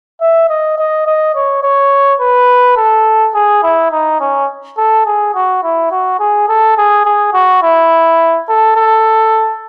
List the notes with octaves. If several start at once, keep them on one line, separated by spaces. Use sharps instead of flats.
E5
D#5
D#5
D#5
C#5
C#5
B4
A4
G#4
E4
D#4
C#4
A4
G#4
F#4
E4
F#4
G#4
A4
G#4
G#4
F#4
E4
A4
A4